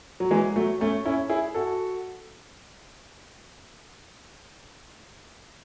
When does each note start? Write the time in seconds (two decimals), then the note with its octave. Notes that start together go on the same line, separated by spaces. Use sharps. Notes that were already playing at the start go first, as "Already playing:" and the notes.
0.20 F#3
0.31 E3 G#3
0.56 F#3 A3
0.81 A3 C#4
1.06 C#4 E4
1.30 E4 G#4
1.55 F#4 A4